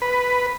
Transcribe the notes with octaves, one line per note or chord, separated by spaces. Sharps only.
B4